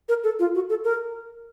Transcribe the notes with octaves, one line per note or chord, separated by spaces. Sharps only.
A#4
A4
F4
F#4
A4
A#4